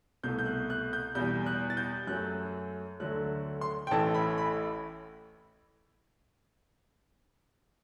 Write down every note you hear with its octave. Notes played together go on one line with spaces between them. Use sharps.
C2 B2 A3 G6
G6
F#6
F#6
G6
E2 B2 G3 G6
F#6
A6
G6
F#2 F#3 A3 F#6
D2 D3 F#3 A3 F#6
C6
G5
A1 A2 E3 A3 A5
B5
B5